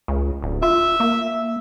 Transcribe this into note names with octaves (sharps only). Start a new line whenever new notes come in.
C#2
D1
F4 E5
A#3